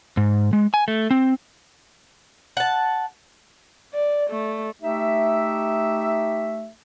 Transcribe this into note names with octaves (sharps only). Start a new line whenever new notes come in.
G#2
G#3
G#5
A3
C4
F#5 A5
D5
A3
A3 D#4 G4 E5